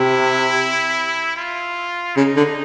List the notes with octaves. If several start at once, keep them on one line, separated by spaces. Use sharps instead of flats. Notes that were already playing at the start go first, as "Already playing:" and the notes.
Already playing: C3 E4
F4
C#3 D#4
D3